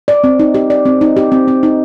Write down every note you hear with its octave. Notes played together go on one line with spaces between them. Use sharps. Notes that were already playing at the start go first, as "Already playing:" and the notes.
D5
C4
D#4
G4
D5
C4
D#4
G4
C4
C4
D#4